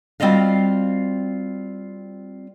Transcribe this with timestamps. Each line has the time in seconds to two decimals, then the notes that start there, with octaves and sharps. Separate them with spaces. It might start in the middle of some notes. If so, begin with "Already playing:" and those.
0.20 G3 C4 F4 F#4 D#5 F5